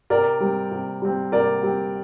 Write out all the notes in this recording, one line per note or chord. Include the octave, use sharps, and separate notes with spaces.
C3 A#4 D5
G3 C4
C3
G3 C4
C3 A#4 D5
G3 C4